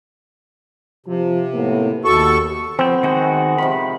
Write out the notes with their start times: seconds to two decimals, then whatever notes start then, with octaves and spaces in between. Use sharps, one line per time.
1.06 C3 F3
1.53 A2 A#3 B3
2.05 D#2 F#4 A4 C#6
2.79 F3 B3 C4 G6
3.03 D#3 G#3 B3 F#4 G6
3.58 C3 D#3 F3 B5